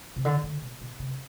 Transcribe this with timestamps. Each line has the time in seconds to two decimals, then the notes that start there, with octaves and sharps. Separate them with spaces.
0.16 C3
0.25 D3
0.43 D3
0.62 B2
0.81 B2
0.99 C3